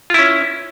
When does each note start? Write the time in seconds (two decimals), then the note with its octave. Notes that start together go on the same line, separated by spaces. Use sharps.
0.10 F4
0.14 E4
0.19 C#4